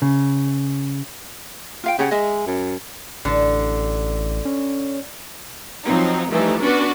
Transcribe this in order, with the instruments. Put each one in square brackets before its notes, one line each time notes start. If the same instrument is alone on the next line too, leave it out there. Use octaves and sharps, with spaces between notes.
[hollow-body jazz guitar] C#3
[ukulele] F4 F5 G5
[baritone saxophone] C#3 [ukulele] G4 C#5 F#5
[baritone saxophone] G#3 [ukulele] D#5 E5
[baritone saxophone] F#2
[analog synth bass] A1 [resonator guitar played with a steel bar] D3
[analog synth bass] C#4
[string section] F3 F#3 C4 D#4
E3 F3 G3 A3 D#4
B3 C#4 D4 F#4 B4